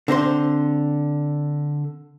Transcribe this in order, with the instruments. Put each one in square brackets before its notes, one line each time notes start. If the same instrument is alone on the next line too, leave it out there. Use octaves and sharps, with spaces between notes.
[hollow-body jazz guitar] D3 C4 C5 C6